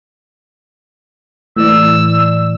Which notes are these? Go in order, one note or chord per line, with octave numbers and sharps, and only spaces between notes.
A2 E3 D5 E6